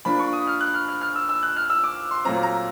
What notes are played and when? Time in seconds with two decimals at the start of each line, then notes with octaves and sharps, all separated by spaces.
0.05 F3 A#3 D4 B5
0.19 C#6
0.33 D#6
0.47 F6
0.60 F#6
0.74 F6
0.88 F6
1.01 F6
1.15 E6
1.29 E6
1.43 F#6
1.56 F6
1.70 E6
1.84 D6
2.11 C6
2.25 A#2 F#3 A3 C4 A#5
2.43 A#5